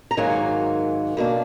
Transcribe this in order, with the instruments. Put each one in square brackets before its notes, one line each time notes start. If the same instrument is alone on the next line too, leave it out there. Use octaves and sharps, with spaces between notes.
[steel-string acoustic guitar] A#5
G#2 D#3 F#3 A#3 G#5
B2 A#3 D4